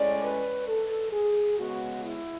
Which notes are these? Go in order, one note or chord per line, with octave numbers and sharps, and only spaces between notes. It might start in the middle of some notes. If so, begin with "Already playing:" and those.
Already playing: A2 G#3 C#4 D5
B4
A4
G#4
C#3 G#3 B3 F#4
E4